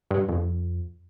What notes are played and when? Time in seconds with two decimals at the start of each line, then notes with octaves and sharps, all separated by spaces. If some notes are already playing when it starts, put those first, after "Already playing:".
0.11 G2
0.29 F2